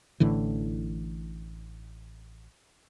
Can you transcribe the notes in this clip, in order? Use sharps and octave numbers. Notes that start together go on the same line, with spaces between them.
A1 A2 D3 E3